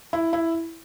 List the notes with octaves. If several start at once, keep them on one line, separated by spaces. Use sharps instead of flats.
E4
E4